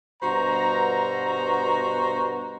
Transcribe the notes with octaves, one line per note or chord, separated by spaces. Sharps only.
G2 B2 F#4 C5 A#5